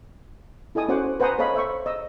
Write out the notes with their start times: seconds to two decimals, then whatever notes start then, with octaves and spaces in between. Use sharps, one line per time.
0.75 E4 A4 D#5 G#5 D#6
0.88 C#4 F#4 C5 F#5 D6
1.20 B4 C5 F#5 G#5 A#5 D#6
1.39 A4 C#5 D#5 F5 B5
1.54 C5 E5 C#6
1.86 D#5 E6